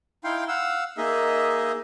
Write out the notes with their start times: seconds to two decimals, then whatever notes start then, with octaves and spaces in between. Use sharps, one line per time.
0.24 D#4 E4 F5 G5 C6
0.48 F5 F#5 E6
0.97 A#3 D#4 G#4 D#5 E5